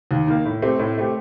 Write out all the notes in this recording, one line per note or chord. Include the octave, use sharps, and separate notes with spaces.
D#2
D#3 A#3
A2
A3 C4 G4
A2
A3 C4 G4